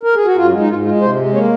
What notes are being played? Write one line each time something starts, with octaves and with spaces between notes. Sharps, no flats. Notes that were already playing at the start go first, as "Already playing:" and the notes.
A#4
G#4
F#4
F#2 F4
G#3
D#4
G#2 F4
G#3 F4
C3 C5
G#3
A#3 C#5